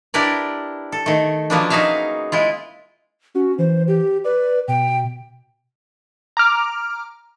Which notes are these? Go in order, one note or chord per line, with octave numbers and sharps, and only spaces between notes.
D4 E4 G4 A#4 B4 D5
A4
D#3 A3
F3 F#3 A#3 B3 C#4 D4
F#3 D#4 F#4 G#4 E5 F5
G#3 E4 F4
C#4 F#4
E3 C5
G4
B4 D5
B2 G5
A#5 D6 F6